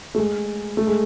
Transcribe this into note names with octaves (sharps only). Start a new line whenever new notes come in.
A3
G#3
A3
G#3